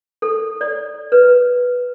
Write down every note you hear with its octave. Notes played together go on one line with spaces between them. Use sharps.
A4
D5
B4